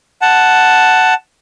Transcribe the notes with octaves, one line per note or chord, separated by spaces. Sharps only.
F#5 A5